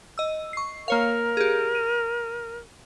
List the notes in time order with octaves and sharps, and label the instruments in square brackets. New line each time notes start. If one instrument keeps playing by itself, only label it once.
[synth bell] D#5 E6
C#6 C7
[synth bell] A#3 C#5 F5 [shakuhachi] A#4
[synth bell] G4 G#4
D#7